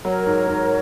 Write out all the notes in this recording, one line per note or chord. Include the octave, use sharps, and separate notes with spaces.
F#3 A#4 C#5
G#2
G#2